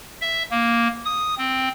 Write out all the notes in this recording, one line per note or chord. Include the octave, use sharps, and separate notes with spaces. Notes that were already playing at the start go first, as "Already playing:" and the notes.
E5
A#3
D#6
C4